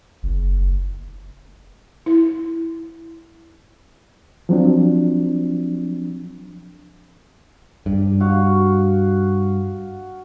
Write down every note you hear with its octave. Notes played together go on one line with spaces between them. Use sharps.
F#1
E4
F3 F#3 C4 D4
G2
F#4 F5